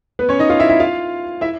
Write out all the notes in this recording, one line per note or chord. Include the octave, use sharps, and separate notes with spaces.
B3 B4
C#4 C#5
D#4 D#5
F4 F5
E4 E5
E4 E5
F4 F5
E4 E5